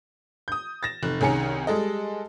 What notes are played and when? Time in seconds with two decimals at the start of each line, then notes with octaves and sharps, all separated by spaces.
0.48 D#6 G6
0.83 A6 A#6 E7
1.03 F1 F#6
1.21 C2 D#3 C#4 G#4 A#5 C#7
1.67 G3 G#3 A4 D#5